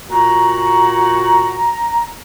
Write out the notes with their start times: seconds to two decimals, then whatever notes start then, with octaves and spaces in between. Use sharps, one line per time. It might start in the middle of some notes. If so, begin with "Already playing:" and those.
0.09 A#2 F#4 A#5